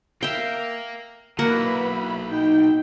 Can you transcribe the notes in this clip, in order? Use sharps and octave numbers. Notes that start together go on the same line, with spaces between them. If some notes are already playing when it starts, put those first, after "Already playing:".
A#4 E5 F5 G5
B1 F#3 A#3 E4 B4 F#5 B5
D#4 G5